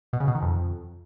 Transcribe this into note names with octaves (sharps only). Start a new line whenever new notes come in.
B2
C#3
B2
D#3
F2